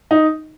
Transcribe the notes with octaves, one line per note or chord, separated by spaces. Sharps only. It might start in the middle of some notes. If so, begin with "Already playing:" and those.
D#4